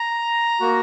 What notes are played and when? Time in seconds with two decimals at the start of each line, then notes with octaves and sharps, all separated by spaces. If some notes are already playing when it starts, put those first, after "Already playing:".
Already playing: A#5
0.60 A#3 F#4